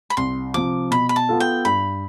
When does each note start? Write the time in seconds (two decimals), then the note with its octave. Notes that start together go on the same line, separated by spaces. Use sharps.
0.10 B5
0.17 C2 C6
0.54 C3 F3 D6
0.91 B2 B5
1.09 B5
1.16 A5
1.29 B3 F4 A4
1.40 G5
1.65 G2 B5